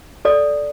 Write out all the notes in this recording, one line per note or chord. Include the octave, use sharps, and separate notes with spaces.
A4 D5